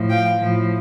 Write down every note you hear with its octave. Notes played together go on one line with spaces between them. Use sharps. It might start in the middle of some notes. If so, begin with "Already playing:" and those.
Already playing: A2 F3
F5 G5
A2 F3